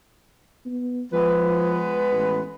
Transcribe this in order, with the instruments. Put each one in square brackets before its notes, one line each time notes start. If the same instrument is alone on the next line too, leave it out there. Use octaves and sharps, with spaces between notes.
[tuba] B3
[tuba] F3 [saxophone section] G#3 B3 B4
[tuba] A1